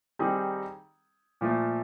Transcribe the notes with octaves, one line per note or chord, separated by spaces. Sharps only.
D#3 G3 C4 D#4 G#4
A#2 F3 A3